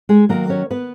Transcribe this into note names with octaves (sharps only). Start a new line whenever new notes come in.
G#3 G#4
D#3 F#3 A#3 A#4
C#4 C#5
B3 B4